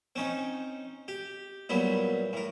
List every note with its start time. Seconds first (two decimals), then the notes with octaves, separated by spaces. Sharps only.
0.16 C4 C#4 D#4
1.08 G4
1.69 A#2 F#3 G3 B3 E4
2.33 A2 A#4